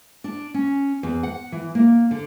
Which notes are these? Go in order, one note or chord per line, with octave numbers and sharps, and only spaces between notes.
D4
C#4
E2
F#5
E3
A#3
D3